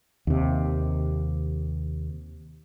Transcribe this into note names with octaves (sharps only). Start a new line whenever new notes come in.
D#2 C3